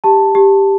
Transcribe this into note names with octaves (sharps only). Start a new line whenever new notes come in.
G4 A5
G4